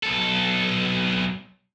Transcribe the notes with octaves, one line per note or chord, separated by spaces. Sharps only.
B1 A4